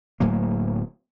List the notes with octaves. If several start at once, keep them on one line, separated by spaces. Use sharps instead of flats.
D1 A2 F#3 A#3